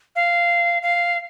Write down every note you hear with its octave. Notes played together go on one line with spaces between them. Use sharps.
F5
F5